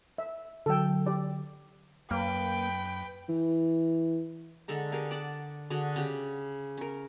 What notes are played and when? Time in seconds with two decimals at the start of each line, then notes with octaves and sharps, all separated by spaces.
0.18 E5
0.66 D3 F#3 A4 G5
1.06 G4 D5
2.11 F#2 A#3 B4 G5
3.29 E3
4.68 D3 G#3 A4 A#5
4.92 G4 G#4 A#4 F5
5.11 D5 F#5 A5
5.70 D3 F#4 G#4
5.96 C#3 G4
6.78 C#4 A#4